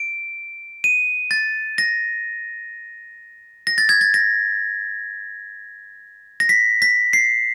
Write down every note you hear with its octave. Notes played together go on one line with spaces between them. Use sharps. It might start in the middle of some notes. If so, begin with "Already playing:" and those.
Already playing: D7
D#7
A6
A#6
A#6
A6
G#6
A6
A#6
A#6
B6
B6
C7